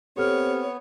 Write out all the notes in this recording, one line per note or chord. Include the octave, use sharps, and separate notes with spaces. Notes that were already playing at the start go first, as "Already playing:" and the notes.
B3 C4 G4 A4 C#5 F6